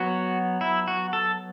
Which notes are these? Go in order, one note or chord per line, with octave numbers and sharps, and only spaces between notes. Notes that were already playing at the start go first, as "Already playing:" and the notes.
Already playing: F#3 B3 F#4
E4
F#4
A4